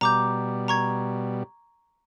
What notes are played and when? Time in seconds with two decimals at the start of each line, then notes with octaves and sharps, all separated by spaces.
0.01 B2 G3 A#5 D6 G6
0.68 A#5 C#6 G#6